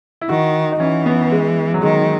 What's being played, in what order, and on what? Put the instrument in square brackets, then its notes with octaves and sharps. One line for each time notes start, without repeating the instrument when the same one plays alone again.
[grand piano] E4
[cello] D#3 [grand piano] F#4
[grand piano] D#4
[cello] E3 [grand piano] C#4
[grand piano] B3
G#3
F#3
[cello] D#3 [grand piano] G#3